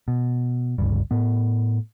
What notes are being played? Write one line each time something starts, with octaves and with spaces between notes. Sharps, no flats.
B2
G1 C#2 G2
A2 B3